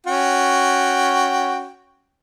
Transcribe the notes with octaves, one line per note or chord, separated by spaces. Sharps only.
C#4 F#4 G5